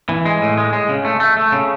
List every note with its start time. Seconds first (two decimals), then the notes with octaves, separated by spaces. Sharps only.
0.09 E3
0.26 G#3
0.42 A2
0.58 G#3
0.73 G#3
0.89 C#3
1.05 A3
1.20 A3
1.37 A3
1.52 C#3